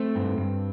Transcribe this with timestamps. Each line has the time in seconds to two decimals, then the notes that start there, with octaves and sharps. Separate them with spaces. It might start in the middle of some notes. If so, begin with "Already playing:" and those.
Already playing: A3 C4
0.16 G2
0.38 G2